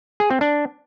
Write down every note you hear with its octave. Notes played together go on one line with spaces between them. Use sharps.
G#4
C4
D4